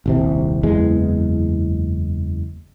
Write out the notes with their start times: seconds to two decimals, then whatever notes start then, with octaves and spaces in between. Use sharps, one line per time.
0.06 D#1 C2 C3
0.63 F#1 E2 E3 G#3